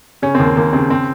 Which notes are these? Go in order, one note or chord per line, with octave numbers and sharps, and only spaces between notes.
C#3 C#4
D#2 C4
A#3
D#2 A#3
C#3 C4
C4